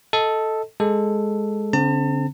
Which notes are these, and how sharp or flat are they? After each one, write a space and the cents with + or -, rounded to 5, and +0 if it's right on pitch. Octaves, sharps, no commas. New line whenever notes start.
A4 +0 D#5 +20 A5 +0
G#3 +0 A4 +0
D3 -40 C4 +0 A5 +40